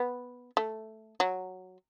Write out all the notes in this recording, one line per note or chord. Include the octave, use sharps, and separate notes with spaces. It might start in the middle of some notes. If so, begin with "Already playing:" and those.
Already playing: B3
A3
F#3